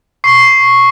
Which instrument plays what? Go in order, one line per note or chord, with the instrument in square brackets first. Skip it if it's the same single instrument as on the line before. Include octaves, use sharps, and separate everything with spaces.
[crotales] C#6 C7